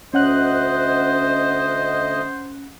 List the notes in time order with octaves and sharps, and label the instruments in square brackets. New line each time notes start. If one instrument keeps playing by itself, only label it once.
[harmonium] D2 D#5 [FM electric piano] C#4 F#5 F#6 [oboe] C5